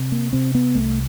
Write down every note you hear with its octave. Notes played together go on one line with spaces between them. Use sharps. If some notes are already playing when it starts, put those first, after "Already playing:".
Already playing: C3
A#3
C3 C4
B3
C2 A3